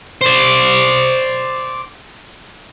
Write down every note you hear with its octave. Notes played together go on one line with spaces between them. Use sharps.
C5 D5